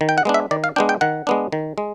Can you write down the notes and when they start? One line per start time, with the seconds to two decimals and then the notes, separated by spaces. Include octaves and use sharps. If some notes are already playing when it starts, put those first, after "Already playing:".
0.01 D#3
0.09 G5
0.18 F#5
0.25 G#3 B3 D4
0.34 E5
0.51 D#3 D5
0.64 F5
0.76 G#3 B3 D4 G5
0.89 G5
1.01 D#3 F#5
1.27 G#3 B3 D4
1.52 D#3
1.78 G#3